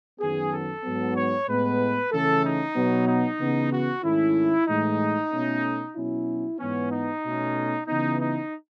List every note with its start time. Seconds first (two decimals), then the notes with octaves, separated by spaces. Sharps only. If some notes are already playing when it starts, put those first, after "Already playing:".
0.20 F#2 D#3 F#3 B3 G#4
0.52 A4
0.83 G#2 F#3 B3
1.16 C#5
1.47 A2 G#3 B3 B4
2.12 C#3 E3 A3 C#4 A4
2.44 D#4
2.75 B2 F#3 B3
3.07 D#4
3.39 C#3 E3 B3
3.72 F#4
4.03 G#2 D#3 A3 C#4 E4
4.67 A2 E3 G#3 D#4
5.31 B2 A3 C#4
5.95 B2 F#3 C#4 E4
6.59 G#2 E3 B3 C#4
6.91 D#4
7.24 B2 A3 C#4
7.87 C#3 E3 B3 D#4
8.20 D#4